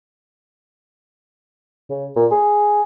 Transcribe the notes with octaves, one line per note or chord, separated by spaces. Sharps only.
C#3
A#2
G#4